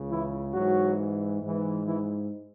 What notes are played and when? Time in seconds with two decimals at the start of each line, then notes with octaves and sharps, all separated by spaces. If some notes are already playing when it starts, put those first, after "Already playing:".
Already playing: C#2 C#3
0.10 E3 E4
0.54 G#2 E3 F#3 F#4
1.42 G#2 E3
1.85 E3 E4